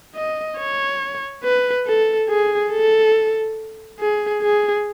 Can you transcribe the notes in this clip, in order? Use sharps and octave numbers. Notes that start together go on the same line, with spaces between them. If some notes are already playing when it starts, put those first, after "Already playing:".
D#5
C#5
B4
A4
G#4
A4
G#4
G#4